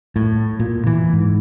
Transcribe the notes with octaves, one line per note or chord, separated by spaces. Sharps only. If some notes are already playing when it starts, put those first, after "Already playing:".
A2
A#2
E3
G#2